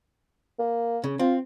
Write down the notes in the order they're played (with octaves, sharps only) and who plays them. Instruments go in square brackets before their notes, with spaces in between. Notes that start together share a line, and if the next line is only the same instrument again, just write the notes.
[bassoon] A#3
[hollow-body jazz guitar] C#3
[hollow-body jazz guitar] C4 [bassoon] F4